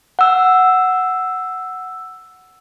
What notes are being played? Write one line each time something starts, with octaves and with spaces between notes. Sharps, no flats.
F#5 E6